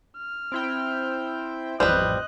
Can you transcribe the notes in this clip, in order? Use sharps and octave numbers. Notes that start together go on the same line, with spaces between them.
F6
C4 E4 G5
A1 F2 G3 B4 C5 D#5 F#6